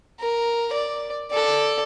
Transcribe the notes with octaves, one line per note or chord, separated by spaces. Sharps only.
A#4
D5
A4 D5